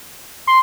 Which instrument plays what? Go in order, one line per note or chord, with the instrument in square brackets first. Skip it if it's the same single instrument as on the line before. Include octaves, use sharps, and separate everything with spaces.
[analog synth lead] C6